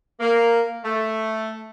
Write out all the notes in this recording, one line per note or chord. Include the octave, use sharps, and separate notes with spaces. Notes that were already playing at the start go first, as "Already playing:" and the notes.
A#3
A3